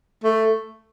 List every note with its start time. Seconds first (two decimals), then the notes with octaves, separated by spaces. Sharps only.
0.24 A3